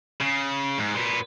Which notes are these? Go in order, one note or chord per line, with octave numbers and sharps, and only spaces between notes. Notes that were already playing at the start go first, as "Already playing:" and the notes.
C#3
G#2
A#2 B3